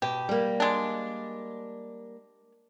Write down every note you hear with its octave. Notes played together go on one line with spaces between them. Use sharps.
B2 G4
G3 A#3
G#3 D4